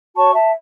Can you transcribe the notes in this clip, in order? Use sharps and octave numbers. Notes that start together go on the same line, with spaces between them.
F#4 C#5 A5 C#6
E5 A5